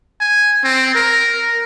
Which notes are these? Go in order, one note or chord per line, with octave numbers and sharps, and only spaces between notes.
G#5
C4
A#4